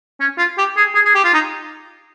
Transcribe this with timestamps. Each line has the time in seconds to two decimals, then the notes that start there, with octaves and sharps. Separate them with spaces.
0.20 C#4
0.38 F4
0.58 G4
0.77 G#4
0.95 G#4
1.05 G#4
1.15 G4
1.24 F4
1.34 D#4